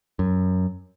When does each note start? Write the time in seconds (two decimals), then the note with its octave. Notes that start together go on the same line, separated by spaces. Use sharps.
0.19 F#2